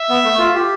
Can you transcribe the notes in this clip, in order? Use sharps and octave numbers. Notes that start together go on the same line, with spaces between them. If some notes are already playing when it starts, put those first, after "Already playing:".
Already playing: E5
B3
A3
F4
G4